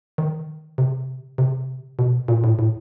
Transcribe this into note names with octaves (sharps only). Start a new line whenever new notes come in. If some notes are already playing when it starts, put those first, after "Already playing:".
D#3
C3
C3
B2
A#2
A2
A2